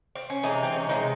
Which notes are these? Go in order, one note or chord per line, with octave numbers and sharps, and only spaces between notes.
C4
C#4
C3 E3 G#3 D#4
C4
C#4
C3 E3 G#3 D#4